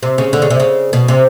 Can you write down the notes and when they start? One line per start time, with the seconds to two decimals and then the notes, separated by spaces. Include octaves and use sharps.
0.03 C3
0.18 C#3
0.33 D3
0.42 C#3
0.50 C3
0.60 C#3
0.93 B2
1.08 C3